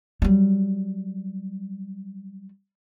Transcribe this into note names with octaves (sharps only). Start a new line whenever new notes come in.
F#3 G3